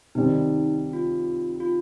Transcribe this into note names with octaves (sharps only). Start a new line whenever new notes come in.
C3 D#3 G3 C4 D#4
F4
F4